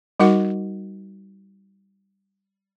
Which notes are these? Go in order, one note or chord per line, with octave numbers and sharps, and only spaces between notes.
G3 D#4 F#4 A#4 F#5